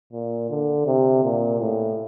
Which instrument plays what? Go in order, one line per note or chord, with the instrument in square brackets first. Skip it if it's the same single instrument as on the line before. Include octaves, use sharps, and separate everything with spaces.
[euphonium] A#2
D3
C3
A#2
A2